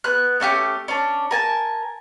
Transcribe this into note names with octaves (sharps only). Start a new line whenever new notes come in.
B3 F#6
A3 C#4 F#4 G4
C#4 D4
A#4 G#5 A5